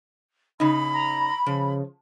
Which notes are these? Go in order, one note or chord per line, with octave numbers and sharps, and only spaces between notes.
C#3 D#4 B5
A#5
C#3 F3